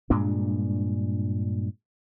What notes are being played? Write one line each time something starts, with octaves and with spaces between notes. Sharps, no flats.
G2 A#2 G#3 D4